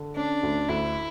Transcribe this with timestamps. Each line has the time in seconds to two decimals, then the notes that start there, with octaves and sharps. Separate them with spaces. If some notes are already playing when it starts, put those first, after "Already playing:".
Already playing: D3
0.16 C#4 D4
0.43 D2
0.69 D2 E4